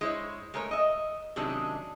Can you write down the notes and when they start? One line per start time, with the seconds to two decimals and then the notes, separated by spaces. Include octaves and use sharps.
0.01 G#3 E4 C5 C#5
0.54 G#3 A3 A#4 C#5
0.71 D#5 E5
1.36 C3 D#3 F#3 G#3 C#4 D4